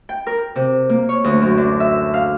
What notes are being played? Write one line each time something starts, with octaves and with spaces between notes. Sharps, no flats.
G5
A#4
C3
A#3
C#5
D2
F#2
D4
E5
F5